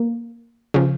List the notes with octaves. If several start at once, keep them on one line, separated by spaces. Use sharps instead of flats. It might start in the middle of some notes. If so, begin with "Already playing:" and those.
Already playing: A#3
C#3 F3